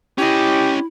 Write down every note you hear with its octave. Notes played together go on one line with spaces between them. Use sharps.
C#4 E4 G4 D#5